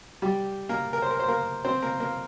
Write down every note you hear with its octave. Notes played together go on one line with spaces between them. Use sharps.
G3 G4
A#3 A#4
A#4
C5
A#4
C5
A#3 A#4
C4 C5
A#3 A#4
A#3 A#4